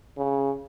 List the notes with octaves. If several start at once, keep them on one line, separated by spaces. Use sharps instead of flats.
C#3